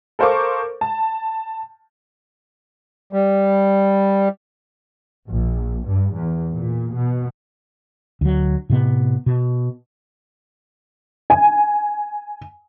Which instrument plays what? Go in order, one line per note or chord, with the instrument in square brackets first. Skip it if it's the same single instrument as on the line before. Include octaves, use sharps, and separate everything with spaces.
[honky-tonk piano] A4 A#4 C5 F5 C#6 D6
A5
[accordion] G3
[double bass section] A#1
G2
E2
A#2
B2
[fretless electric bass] D2 F#3
A2 C3 B3
B2
[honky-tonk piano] G#5